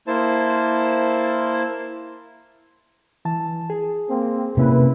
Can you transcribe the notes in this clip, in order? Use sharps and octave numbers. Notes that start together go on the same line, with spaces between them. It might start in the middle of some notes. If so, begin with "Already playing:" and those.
A#3 E4 C5 A5
E3 A5
G#4
A#3 C4
C3 A#3 C#4 E4 B4